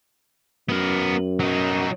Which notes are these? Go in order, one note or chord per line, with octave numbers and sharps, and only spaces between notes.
F#2 B3 A#4
F#3 D#4